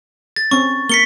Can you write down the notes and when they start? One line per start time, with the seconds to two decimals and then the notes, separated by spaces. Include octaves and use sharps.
0.36 A6
0.51 C4 C#4 C#6
0.89 A#3 B6 C#7 G7